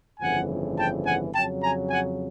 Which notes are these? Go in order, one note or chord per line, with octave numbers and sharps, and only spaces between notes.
G1 F2 C#3 E3 F#5 G#5
G5 A5
F#5 G#5
F2 C#3 F#3 G5 A5
G#5 A#5
F#5 G#5